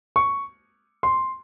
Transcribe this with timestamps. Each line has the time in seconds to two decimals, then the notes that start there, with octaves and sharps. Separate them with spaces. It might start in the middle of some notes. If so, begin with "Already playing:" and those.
0.16 C#6
1.03 C6